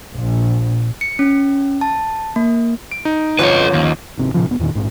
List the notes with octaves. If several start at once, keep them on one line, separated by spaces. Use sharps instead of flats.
A#1
C#7
C#4
A5
A#3
D7
D#4
G1 F2 F3 F#3 C#4 F4 B4 C#5
D#2
G#1 C3
A#2 C#3 F3
D#1 B3
E2 A#2 D#3
A#1 G#2